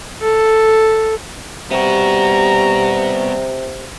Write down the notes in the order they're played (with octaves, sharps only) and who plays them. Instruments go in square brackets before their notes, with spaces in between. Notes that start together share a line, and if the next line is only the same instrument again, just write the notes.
[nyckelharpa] A4
[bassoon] C3 [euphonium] G3 [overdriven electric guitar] B3 F#4 [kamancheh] A#5